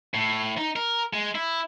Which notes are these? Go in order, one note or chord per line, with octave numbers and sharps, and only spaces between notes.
A2
D#4
A#4
G#3
E4